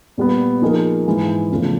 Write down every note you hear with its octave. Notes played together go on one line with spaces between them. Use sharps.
A#2 G3 B3
F3 A#3 D#4 G#4
G#2 E3 G#3
E2 C#3 F3 A3